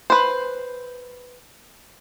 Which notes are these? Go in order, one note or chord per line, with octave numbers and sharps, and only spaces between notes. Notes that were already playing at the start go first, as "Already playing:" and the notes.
B4 C5